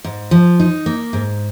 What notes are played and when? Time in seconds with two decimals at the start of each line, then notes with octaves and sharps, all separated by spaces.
0.04 G#2
0.31 F3
0.60 D#4
0.86 A#3
1.13 G#2